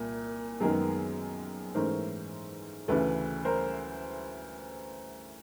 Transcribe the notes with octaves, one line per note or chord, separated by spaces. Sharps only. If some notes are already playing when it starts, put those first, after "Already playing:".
Already playing: C2 A#2
F#2 D#3 G#3 B3 G#4 A#4
G#2 E3 A3 C#4 A#4 C5
D2 C#3 E3 A4 B4
A#4 C5